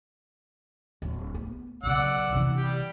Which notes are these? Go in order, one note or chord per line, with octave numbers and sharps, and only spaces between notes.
D1
A3 B3
B1 C#3 D5 F#5 E6
C3 E3
G3 G4